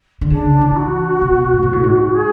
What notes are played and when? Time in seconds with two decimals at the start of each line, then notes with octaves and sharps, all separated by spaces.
0.21 D3
0.30 C#3 D4
0.61 E3
0.77 F#4
1.21 B2
1.53 A2
1.63 B2
1.73 A2
1.83 G#2
2.13 G#4